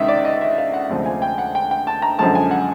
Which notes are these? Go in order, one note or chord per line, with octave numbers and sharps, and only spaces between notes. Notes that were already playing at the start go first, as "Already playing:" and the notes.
Already playing: C#2 C3 D#3 D#5 E5
D5
D#5
E5
F5
F#5
D2 C3 F3 G#3
G#5
G5
F#5
G5
G5
A5
A#5
F#2 D3 F3 G#3 A5
G#5
F#5